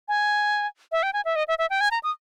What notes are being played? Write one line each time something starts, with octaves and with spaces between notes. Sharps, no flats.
G#5
E5
G5
G#5
E5
D#5
E5
E5
G5
G#5
A#5
D#6